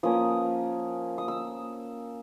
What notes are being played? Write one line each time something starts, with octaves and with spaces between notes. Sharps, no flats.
F3 A#3 C#4 D#6
D#6
E6